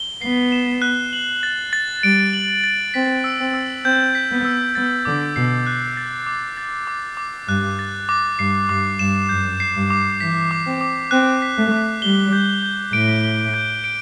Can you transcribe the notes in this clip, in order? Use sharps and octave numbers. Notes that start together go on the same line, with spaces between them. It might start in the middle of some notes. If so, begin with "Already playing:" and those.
Already playing: G7
B3 C7
E7
F#6
F#7
A6
A6
G3 D7
F#7
A6
C4 B6
E6
C4
E6
C4 G6
B6
B3
E6
B3 A6
D3 D6
B2 C7
F#6
A6
D6
A6
D6
D6
G2 F#6
A6
D6
G2 C7
G2 D6
G2 E7
F#2 G6
C7
G2
D6
E3 B6
D6
C4
D6
C4 F#6
B6
A3
D6
G3 G7
G6
G6
A2 D7
G7
G6
D7